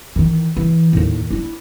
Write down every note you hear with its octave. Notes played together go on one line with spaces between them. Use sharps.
D#3 E3
E3
D#2 A2
D4 E4